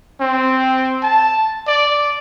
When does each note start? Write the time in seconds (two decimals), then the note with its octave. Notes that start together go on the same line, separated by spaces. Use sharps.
0.21 C4
1.03 A5
1.68 D5